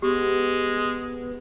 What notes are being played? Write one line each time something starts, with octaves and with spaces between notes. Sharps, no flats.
G#3 B3 G4